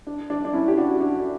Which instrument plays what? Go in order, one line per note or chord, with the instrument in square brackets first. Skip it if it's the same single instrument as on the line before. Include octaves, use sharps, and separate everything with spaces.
[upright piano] D4
D4
D4
C#4 E4
G4
D4 F#4
D4 F#4